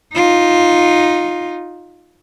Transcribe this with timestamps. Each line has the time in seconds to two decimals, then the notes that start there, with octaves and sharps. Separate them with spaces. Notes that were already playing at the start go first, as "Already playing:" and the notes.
0.14 D#4 F4